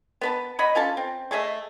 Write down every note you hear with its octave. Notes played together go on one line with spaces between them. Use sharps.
B3 B4 A5
C#5 D#5 F#5 B5
C#4 F4 A4 A5
C4
A3 G#4 D#5 E5